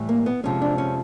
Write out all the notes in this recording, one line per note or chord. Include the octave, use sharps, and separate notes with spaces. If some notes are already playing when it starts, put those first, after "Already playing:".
Already playing: A2 E3 G3
A#3
B3
F2 C3 F3 G#3 C#4
D4
C#4